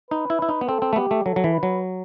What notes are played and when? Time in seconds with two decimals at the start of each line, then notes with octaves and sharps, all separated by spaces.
0.11 D#4 B4
0.30 E4
0.42 E4
0.49 D#4
0.61 B3
0.68 C4 A4
0.82 C4
0.93 A3
0.96 B3 G4
1.11 A3
1.25 F#3 A4
1.36 F#3
1.44 E3
1.53 B4
1.63 F#3